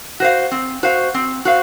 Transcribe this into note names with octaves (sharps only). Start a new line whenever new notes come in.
F#4 C5 F5
C4
F#4 C5 F5
C4
F#4 C5 F5